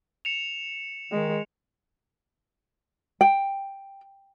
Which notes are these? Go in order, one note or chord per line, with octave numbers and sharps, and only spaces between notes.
C#7 E7 F7
D#3 G#3
G5